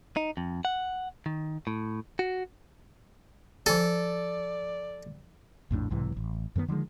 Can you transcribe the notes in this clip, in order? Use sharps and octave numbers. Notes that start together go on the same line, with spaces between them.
D#4
F2
F#5
D#3
A2
F#4
F3 A4 D5 G#5
A#1 F2 A2 D4
B1 G#2 C3 E3
A1
F#2 D#3 A3 B3
D3 D#3 F3 G#3